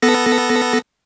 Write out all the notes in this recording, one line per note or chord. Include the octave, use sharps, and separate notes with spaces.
B3 A4 A#6